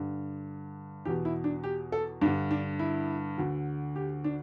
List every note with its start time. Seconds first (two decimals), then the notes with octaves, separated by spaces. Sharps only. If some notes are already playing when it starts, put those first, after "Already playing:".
Already playing: G2 D3
1.05 E2 B2 G4
1.25 E4
1.44 D4
1.64 G4
1.92 A4
2.21 G2 D4
2.26 D3
2.51 D4
2.79 E4
3.38 D2 D3
3.96 G4
4.24 D4